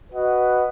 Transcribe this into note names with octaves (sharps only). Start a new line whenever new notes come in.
F#4 B4 D#5 F#5